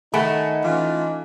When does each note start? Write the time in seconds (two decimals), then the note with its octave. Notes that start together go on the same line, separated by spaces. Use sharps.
0.14 D#3 A3 D#4 F#5 G#5 B5
0.64 E3 C#4 F4